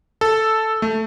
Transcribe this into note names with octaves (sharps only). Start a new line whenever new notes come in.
A4
A3